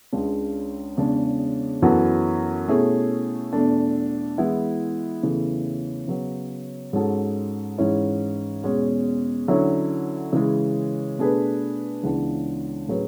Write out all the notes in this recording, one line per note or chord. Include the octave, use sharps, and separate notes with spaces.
C#2 C#3 G#3 D4
E2 C#3 G#3 D4
F#2 E3 B3 F#4 A4
B2 A3 C#4 E4 G#4
E2 B2 A3 D4
E3 G#3 B3 E4
E2 C#3 E3 A3
C#3 F#3 B3
G#2 G#3 C#4 F#4 A4
G#2 E3 G#3 C#4 E4
E2 B2 G#3 C#4
D3 F#3 C#4 E4
C#3 E3 G#3
B2 A3 D4 G#4 B4
C#2 C#3 E3 B3 D4
A2 F#3 C#4 G#4 B4